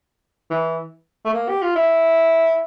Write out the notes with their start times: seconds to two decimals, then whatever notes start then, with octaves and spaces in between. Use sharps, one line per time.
0.50 E3
1.25 A3
1.34 A#3
1.49 G4
1.62 F4
1.76 E4